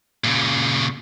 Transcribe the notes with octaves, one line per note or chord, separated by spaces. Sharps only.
A#2 C#3